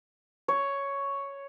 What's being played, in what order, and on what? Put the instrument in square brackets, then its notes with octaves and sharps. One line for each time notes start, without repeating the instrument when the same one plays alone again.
[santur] C#5